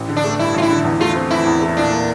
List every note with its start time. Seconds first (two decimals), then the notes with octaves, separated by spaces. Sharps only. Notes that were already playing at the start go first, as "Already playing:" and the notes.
Already playing: A1
0.09 D3
0.16 D4
0.24 A3
0.39 G2 E4
0.54 A1 F4
0.62 E4
0.70 D3
0.85 E2
1.00 A3 F4
1.15 C4
1.31 E3 E4
1.47 E2
1.62 A3
1.77 A#2 D4
1.92 A#3